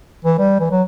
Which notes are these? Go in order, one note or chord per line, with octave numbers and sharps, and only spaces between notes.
E3
G3
E3
F#3